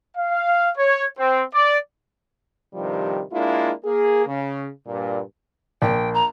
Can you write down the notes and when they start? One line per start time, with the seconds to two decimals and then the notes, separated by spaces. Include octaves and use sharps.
0.17 F5
0.78 C#5
1.18 C4
1.54 D5
2.74 G2 C3 D#3 F3 G3
3.32 G#3 A#3 D4 E4 F4
3.84 A#3 G#4
4.26 C#3
4.87 G2 A#2
5.82 A#1 G5
6.14 A#5